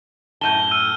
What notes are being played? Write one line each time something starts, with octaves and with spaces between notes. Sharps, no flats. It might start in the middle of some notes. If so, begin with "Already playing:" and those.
F#2 A2 A5 G6 D#7 G7
E6 F6 D#7